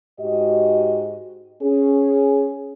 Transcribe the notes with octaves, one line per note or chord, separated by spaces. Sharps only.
G#2 F#4 G4 D#5
C#4 G#4